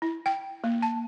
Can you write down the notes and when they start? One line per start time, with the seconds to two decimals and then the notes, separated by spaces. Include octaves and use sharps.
0.02 E4
0.26 G5
0.64 A#3
0.82 A5